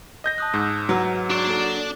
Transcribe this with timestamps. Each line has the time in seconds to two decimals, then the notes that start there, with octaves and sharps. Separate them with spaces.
0.24 D#5 G6 A#6
0.38 A5 D#6 F#6
0.54 G#2 E6 G6
0.89 F#3 B4
1.30 D4 F#4 D5 C#6 C7
1.47 A#3 A4